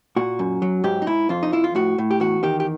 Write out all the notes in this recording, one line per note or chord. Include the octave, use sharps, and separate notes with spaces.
A#2 F#4
F#2
F#3
G#2 G4
D#4
G#2 E4
F2 F4
D#4
F3 E4
F4
A2 F#4
A2
G4
E2 F#4
D#3 G4
G4